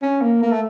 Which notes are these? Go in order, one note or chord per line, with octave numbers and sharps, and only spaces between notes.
C#4
A#3
A#3
A3